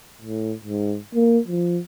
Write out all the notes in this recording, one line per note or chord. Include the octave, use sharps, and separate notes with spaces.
A2
G#2
A#3
F3